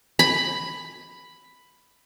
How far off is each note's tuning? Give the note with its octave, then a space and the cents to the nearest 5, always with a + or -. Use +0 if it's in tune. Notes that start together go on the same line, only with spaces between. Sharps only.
B5 +5